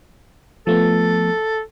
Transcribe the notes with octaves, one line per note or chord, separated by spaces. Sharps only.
F3 A3 B3 A4